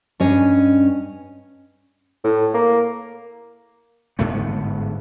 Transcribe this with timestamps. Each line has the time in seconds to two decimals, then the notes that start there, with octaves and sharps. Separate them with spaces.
0.20 G2 C#4 D#5
2.24 A2
2.54 A#3
4.19 G1 G#2 A3 B3